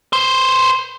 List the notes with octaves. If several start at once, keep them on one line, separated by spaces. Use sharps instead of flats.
B4 C5